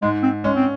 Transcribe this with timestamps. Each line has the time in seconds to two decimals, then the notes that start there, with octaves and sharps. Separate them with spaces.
0.02 G#2 G#3
0.23 C4
0.44 G#3 C#4
0.55 C4